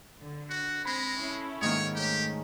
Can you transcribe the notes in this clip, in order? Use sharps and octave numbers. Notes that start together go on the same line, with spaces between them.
D3
F#4
G#3 C4 B5 A#6 B6
C#4 E4 A4
G#2 D#3 A#3 C#5
A3 C#4 G4